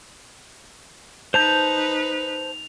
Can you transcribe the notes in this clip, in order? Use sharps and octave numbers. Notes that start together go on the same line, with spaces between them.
D#4 B4 C5 A5 G6 F7